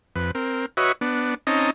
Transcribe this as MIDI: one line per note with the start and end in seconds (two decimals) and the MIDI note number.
0.16 0.31 41
0.16 0.31 71
0.35 0.66 60
0.35 0.66 70
0.77 0.92 66
0.77 0.92 71
0.77 0.92 73
0.77 0.92 75
0.77 0.92 76
1.01 1.34 59
1.01 1.34 62
1.47 1.70 60
1.47 1.70 61
1.47 1.70 63
1.47 1.70 75
1.47 1.70 81
1.47 1.70 82